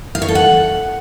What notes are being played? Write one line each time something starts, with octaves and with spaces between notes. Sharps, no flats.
F5
C#5
A4
F#5